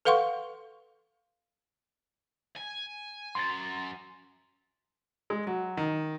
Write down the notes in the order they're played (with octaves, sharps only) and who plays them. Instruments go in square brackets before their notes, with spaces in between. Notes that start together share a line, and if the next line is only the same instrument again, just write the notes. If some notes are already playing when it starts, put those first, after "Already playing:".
[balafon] A4 B4 F5 F#5 C6 C#6
[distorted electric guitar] G#5
[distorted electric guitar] F#2 [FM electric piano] C6 A6
[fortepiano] G#3
F#3
D#3